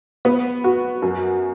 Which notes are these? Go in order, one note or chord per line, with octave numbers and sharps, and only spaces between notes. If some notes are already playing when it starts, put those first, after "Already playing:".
B3
F#4
F#2